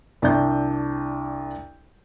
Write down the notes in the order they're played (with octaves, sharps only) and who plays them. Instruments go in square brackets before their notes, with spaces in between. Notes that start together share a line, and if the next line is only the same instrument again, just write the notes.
[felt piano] C2 D4 D5 G6